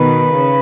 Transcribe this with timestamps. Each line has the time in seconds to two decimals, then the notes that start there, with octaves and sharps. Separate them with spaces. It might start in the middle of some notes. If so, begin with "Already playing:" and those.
Already playing: B2 D#3 B4
0.32 C#3